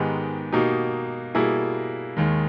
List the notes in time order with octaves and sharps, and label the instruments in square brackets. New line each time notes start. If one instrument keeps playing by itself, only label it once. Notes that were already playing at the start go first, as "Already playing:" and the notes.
Already playing: [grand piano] G#2 D#3 G#3 B3 G4
B2 A#3 D#4 G4
B2 G3 A#3 E4 G#4
D#2 D#3 G#3